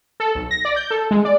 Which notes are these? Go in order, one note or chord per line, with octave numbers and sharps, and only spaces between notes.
A4
B1
A#6
D5
G6
A4
G#3
D5